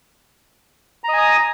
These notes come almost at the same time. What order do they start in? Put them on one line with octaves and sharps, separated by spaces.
A#5 D#5 G#5 D#6